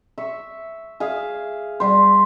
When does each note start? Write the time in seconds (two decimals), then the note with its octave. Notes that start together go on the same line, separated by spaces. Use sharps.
0.18 E5 C#6
1.00 G#4 E5 F5
1.80 G3 C5